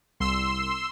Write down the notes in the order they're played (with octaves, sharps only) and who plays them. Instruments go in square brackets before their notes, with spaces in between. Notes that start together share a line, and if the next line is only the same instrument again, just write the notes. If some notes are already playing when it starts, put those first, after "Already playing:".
[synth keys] C2 [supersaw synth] C6 E6